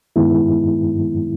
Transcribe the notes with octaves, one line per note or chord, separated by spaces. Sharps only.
G2 D#3 G#3 B3 E4